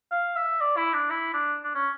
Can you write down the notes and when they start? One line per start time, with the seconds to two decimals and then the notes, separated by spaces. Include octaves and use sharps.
0.12 F5
0.36 E5
0.61 D5
0.77 E4
0.93 D4
1.10 E4
1.34 D4
1.63 D4
1.75 C#4